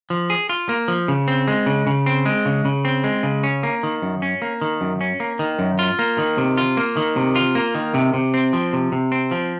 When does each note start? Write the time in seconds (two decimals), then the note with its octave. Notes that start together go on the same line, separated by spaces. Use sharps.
0.10 F3
0.30 G#4
0.49 F4
0.69 A#3
0.88 F3
1.08 C#3
1.28 C4
1.48 G#3
1.66 C#3
1.87 C#3
2.06 C4
2.26 G#3
2.46 C#3
2.65 C#3
2.85 C4
3.04 G#3
3.23 C#3
3.43 C#4
3.63 A#3
3.83 D#3
4.02 F#2
4.22 C#4
4.42 A#3
4.61 D#3
4.81 F#2
5.01 C#4
5.20 A#3
5.39 D#3
5.59 F#2
5.79 F4
5.99 A#3
6.18 D#3
6.38 C3
6.58 F4
6.77 A#3
6.97 D#3
7.16 C3
7.36 F4
7.55 A#3
7.75 D#3
7.94 C3
8.14 C3
8.34 C4
8.53 F3
8.73 C3
8.92 C3
9.12 C4
9.31 F3